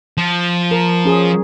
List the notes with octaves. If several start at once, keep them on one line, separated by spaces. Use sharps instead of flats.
F3
A#4
C#4 G#4